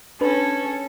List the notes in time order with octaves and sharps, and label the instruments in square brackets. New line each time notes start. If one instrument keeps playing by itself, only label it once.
[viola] C#4 A4 [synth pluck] D4 B4